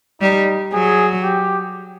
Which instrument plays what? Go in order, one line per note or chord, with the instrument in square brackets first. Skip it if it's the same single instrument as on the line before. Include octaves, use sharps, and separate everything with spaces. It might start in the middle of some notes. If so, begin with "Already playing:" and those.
[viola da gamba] G3 [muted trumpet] D#4
[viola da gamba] F#3 [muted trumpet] G#4
[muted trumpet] G4